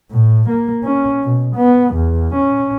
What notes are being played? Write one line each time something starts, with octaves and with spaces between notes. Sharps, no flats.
A2
A#3
C#4
B2
B3
E2
C#4